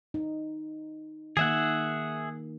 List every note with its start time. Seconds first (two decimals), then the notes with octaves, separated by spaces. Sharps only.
0.14 D#4
1.37 D#3 A#3 G#4 E5 F#5